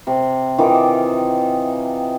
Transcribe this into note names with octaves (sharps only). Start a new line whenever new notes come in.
C3
D#3 E3 F4 D6